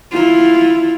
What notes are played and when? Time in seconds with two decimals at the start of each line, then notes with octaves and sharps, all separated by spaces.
0.13 E4 F4